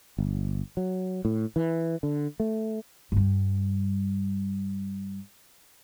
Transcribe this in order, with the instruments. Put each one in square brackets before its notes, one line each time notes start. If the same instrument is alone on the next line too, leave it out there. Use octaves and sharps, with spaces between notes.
[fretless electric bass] G1
F#3
A2
E3
D3
A3
[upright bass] G2 G3